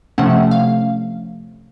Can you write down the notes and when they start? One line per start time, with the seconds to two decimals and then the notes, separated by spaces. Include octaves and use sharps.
0.18 C3 F3 A3 C#4 F#5
0.51 F5